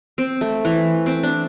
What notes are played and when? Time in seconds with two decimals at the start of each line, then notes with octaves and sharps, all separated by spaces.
0.18 C4
0.41 A3
0.65 E3
1.06 C4
1.23 D4